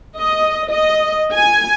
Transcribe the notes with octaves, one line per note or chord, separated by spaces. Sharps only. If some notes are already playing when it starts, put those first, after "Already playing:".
D#5
D#5
G#5